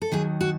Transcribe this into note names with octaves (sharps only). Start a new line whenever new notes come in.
A4
D#2 D#3 F#3 G#4
F#4